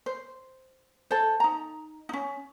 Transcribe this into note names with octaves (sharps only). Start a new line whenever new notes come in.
C5
A4 C5
D#4 A#5
C#4 D#4